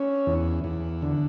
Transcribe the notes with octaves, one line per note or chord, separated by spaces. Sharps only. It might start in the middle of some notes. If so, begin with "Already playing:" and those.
Already playing: C#4
E2
E2
D3